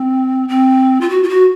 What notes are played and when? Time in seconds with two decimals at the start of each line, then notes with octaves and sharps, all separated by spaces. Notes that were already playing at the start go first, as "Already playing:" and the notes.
Already playing: C4
0.49 C4
1.01 F4
1.09 F#4
1.23 F4
1.29 F#4